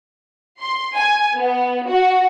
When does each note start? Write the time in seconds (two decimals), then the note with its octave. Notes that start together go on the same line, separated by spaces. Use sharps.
0.61 C6
0.96 G#5
1.36 B3
1.87 F#4